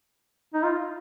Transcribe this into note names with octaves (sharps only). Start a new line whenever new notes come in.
D#4
F4